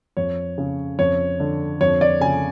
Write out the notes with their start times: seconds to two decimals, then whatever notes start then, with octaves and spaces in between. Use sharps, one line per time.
0.17 F2 C#5
0.58 C#3
0.99 F2 C#5
1.40 D3
1.81 F2 C#5
2.01 D5
2.21 C#3 G#5